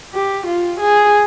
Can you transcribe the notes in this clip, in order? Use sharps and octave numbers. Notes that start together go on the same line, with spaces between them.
G4
F4
G#4